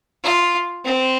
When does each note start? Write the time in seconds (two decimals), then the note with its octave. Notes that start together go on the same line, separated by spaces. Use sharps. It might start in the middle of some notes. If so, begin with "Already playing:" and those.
0.23 F4
0.84 C4